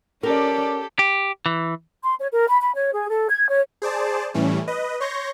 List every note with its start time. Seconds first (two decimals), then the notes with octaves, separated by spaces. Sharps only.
0.23 C#4 G4 A4 A#4 D5
0.99 G4
1.46 E3
2.03 C6
2.19 C#5
2.32 A#4
2.48 B5
2.61 B5
2.76 C#5
2.94 G#4
3.08 A4
3.29 G#6
3.49 C#5
3.82 G#4 C5 D5 A5
4.34 A2 E3 G3 A3 C#4
4.67 B4 D#5
5.00 C#5 C6 C#6 G6 A#6